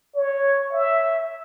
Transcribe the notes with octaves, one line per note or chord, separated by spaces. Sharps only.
C#5
E5